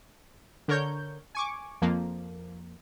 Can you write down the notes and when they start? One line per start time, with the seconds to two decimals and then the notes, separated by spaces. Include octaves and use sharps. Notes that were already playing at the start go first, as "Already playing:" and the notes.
0.68 D3 A#4 C#5 G6
1.35 G#5 C#6 D6
1.82 F2 F3 A#3